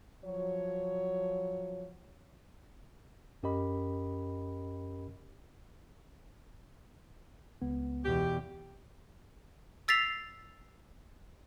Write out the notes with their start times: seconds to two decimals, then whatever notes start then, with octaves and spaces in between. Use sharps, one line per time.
0.24 F3 F#3 C#5
3.43 F#2 C#4 G4 A#4 D#5 B5
7.62 C#2 B3
8.04 E2 B2 G4
9.88 E6 A6 B6 C7 F7